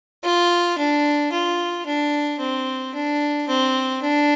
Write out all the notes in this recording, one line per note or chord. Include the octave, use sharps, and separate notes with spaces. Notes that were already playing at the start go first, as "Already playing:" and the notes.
F4
D4
F4
D4
C4
D4
C4
D4